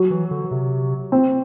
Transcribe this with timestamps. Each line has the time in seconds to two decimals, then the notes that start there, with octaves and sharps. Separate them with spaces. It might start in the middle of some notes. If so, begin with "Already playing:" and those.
Already playing: F#3
0.10 E3
0.31 D3
0.51 C3
1.12 C4